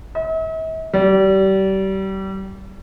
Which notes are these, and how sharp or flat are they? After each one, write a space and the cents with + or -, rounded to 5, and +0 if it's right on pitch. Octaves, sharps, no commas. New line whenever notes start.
E5 -45
G3 -30